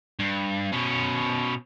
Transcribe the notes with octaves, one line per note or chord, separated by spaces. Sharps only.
G2
B2 C#4